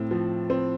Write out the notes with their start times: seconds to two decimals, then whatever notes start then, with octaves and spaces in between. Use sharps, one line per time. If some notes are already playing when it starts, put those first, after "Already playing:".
Already playing: A2 C4
0.11 F3
0.50 C4